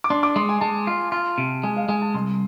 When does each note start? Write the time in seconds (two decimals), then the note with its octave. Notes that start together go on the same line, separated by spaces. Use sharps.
0.04 D6
0.10 D4 C6
0.23 D6
0.36 G#3 C6
0.49 G#5
0.61 G#3 A5
0.87 F4
1.12 F4
1.38 C3
1.63 G#3 G#5
1.77 F5
1.89 G#3 G#5
2.02 A5
2.14 C2 C6